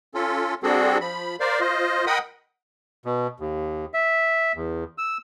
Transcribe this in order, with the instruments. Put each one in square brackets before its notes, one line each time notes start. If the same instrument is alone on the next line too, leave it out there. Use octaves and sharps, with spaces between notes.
[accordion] C#4 F4 A4
G3 C4 D4 F#4 G#4 A4
F3 B5
A#4 C5 D5 F5
F4 C5 D#5
A#4 D#5 F#5 G5 B5 D#6
[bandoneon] B2
D#2
E5
E2
E6